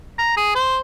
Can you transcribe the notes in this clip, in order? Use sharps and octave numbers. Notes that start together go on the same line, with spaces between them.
A#5
G#4
C5